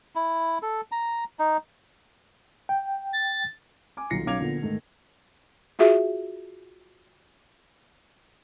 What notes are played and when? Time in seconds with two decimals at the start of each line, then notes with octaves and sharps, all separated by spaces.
0.15 E4
0.62 A4
0.92 A#5
1.39 D#4
2.69 G5
3.13 A6
3.97 G#5 D6
4.10 D#1 B1 F4 A#6 C7 C#7
4.26 B1 C#4 F5 D6 G#6 F7
4.40 A#2 D3 F3 B3
4.62 G#2 D#3 A3
5.79 F4 F#4 G#4 E5